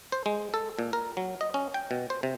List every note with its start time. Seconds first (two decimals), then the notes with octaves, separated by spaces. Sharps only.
0.12 C5
0.26 G#3
0.54 A4
0.79 A#2
0.93 A#4
1.17 F#3
1.41 D#5
1.54 C#4
1.74 G5
1.91 B2
2.10 C5
2.23 C3